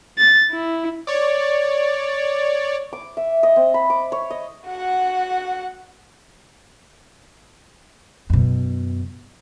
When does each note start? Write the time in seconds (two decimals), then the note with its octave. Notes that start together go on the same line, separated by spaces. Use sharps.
0.18 A6
0.52 E4
1.07 C#5 D5
2.93 D6
3.17 E5
3.43 D#5
3.56 C4
3.74 B5
3.90 D6
4.12 C#5
4.30 D#5
4.67 F#4 F#5
8.30 F#2 B2